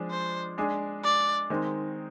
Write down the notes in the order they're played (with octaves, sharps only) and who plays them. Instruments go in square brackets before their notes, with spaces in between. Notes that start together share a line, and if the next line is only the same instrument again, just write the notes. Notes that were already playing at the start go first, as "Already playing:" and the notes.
Already playing: [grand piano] F3 G#3 D4 G#4
[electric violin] C5
[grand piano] G#3 D4 G#4
[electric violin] D5
[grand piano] D#3 G#3 C4 D#4